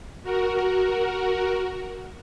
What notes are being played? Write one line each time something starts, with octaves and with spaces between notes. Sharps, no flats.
F#4 A#4